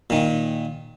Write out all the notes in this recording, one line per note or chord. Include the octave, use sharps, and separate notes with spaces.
A#2 D#3